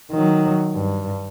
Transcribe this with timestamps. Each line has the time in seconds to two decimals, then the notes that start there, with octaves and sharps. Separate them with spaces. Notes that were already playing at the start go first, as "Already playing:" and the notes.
0.12 D#3 F#3
0.74 G2